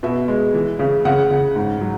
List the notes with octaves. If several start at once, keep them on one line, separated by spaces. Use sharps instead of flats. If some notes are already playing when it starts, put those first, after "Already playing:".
B2 E5
G#3
E3
C#3
C#3 F#5
C#3
G#2
F#3